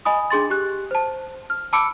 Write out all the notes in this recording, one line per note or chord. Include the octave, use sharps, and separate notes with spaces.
D#5 G#5 B5 D#6
D4 G#4 C6 A6
G4 F#6
C5 A5
F6
A5 B5 D6 E6 C#7 D7